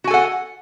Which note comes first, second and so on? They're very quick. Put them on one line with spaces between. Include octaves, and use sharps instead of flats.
F#4 G#5 A4 F#5